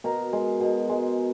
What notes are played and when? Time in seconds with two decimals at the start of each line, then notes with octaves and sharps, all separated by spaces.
0.04 B2 A#4 A#5
0.33 G#3
0.60 B2
0.89 G#3